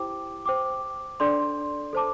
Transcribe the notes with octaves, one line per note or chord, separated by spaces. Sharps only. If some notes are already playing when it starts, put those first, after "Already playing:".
Already playing: E4 G4 C5 G5 D6
C5 G5 D6
D4 A4 D5 C6
A4 C5 A5 D6